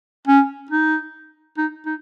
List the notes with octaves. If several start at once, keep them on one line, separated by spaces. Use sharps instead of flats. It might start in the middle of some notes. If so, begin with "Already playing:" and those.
C#4
D#4
D#4
D#4